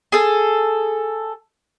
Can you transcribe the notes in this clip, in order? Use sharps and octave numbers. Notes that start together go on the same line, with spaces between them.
G#4 A4